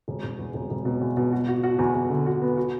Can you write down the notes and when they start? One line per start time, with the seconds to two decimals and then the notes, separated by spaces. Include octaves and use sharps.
0.08 E1
0.23 E1
0.39 E2
0.54 E1
0.70 E1
0.85 B2
1.01 E2
1.17 B2
1.33 F#4
1.48 F#4
1.64 F#4
1.79 E2
1.94 E2
2.10 D3
2.26 F#4
2.42 B3
2.57 F#4